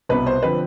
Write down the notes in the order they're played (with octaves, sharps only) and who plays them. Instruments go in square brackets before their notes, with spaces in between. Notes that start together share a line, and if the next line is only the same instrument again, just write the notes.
[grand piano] C2 B2 B3 [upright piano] B4
[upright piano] C5
[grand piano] D3 F3 C4 [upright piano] B4